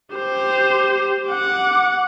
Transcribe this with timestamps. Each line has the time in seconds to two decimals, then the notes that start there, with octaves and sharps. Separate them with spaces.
0.15 G4 C5
1.29 F#5 D6